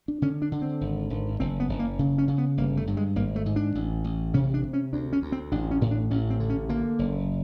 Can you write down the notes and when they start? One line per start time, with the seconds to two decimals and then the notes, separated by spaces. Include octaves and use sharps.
0.08 D4
0.22 D3 C#4
0.42 D4
0.52 D3
0.62 C4
0.81 G#1
1.10 G#1
1.40 F#1 C4
1.60 B3
1.69 F#1
1.79 A#3
1.99 C#3
2.18 C#4
2.28 C#3
2.38 B3
2.57 G1 A#3
2.77 A3
2.87 G2
2.97 G#3
3.16 G#1 A#3
3.36 A3
3.46 G#2
3.56 D4
3.75 A1
4.04 A1
4.34 C3 C#4
4.54 D4
4.64 C3
4.73 C#4
4.93 D2 D4
5.13 C#4
5.22 D2
5.32 C4
5.52 A1 D4
5.71 C#4
5.82 A2
5.91 D4
6.10 A1 C#4
6.30 C4
6.40 D3
6.50 C#4
6.69 D3 A#3
6.99 F#1